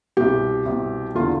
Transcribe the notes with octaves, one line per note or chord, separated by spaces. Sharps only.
C2 B2 G4
C2 B2
E2 D3 F4